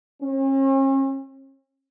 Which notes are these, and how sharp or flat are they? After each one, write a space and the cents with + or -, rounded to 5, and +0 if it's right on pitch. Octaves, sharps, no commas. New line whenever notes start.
C#4 -40